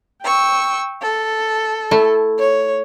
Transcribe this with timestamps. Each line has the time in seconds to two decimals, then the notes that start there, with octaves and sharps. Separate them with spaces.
0.23 G5 C#6 E6
1.01 A4
1.91 A3 E4
2.38 C#5